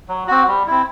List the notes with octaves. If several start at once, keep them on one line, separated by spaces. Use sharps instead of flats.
F#3
C4 F#4
G3
C4 E4